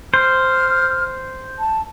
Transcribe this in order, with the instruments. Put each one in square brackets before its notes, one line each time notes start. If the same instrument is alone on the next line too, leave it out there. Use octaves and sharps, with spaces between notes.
[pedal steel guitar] C5 [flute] F6
[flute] A5